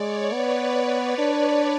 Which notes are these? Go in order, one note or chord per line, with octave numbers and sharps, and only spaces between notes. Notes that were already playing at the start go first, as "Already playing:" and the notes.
Already playing: G#3 C#5 D5
B3 B4
D4